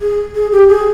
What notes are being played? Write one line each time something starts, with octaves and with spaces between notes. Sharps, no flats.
G#4
G#4
G4
G#4